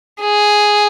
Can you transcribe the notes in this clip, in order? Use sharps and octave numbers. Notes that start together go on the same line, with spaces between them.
G#4